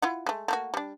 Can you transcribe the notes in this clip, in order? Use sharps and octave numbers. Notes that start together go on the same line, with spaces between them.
E4 F4 F#5
G#3 A3
A3 A#3 F#4
G3 D4